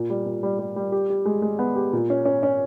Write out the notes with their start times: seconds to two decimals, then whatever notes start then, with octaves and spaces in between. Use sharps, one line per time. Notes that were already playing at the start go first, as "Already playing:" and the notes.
Already playing: A#2
0.10 G3
0.25 A#2
0.43 G3
0.59 G3
0.76 G3
0.92 G4
1.10 G4
1.25 G#3
1.42 G#3
1.59 B3
1.76 G4
1.93 A#2
2.10 C#4
2.25 C#4
2.43 C#4